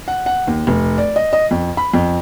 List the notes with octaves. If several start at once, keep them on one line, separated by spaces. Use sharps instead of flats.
F#5
F#5
D#2
F1
D5
D#5
D#5
F2
B5
F2